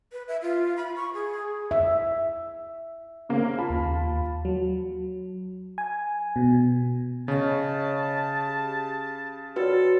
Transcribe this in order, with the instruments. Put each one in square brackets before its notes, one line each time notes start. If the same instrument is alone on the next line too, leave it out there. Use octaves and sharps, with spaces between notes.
[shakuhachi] B4
E5
F4
B5
C#6
G#4
[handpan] E5
[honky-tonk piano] C#3 A#3 C4
F4 A5 B5
[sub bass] D#2
[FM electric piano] F#3
G#5
B2
[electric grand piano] C#3 [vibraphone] C#5 D#5 C#6 [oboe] A5
[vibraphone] G4
[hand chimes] F#4 B4 [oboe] A4 [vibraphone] C#5 D5 G5